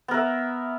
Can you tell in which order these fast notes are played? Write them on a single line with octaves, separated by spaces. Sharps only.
B3 A#4 E5